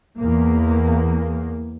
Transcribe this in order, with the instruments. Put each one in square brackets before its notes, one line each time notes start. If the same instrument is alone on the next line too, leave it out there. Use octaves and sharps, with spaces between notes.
[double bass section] E2 A#3